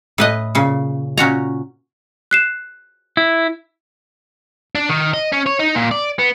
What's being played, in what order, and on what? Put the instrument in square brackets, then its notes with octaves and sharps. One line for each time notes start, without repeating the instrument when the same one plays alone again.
[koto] A2 B4 D#5
A#2 C#3
A#2 C#4 F#4 A#5
[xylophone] F#6 C7 E7
[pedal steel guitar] E4
[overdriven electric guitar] D4
D#3
D#5
C#4
C#5
D#4
A#2
D5
B3